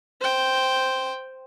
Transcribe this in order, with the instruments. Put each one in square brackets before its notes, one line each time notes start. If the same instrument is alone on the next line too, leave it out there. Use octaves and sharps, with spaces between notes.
[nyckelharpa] C5 G5